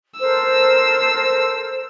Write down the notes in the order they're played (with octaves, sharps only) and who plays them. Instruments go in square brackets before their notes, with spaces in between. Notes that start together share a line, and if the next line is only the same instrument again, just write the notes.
[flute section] A4 A#4 C5 [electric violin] E6